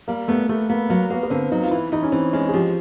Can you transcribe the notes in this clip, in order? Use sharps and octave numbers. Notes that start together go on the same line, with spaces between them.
G3 A#3
A3 B3
A3 B3
A#3 B3
F#3 A#3
A#3 B3
B3
D3 C4
F#3 D#4
F4
E3 E4
E3 D#4
C#4
E3 C4
G#3 C#4
G#4
F3 G4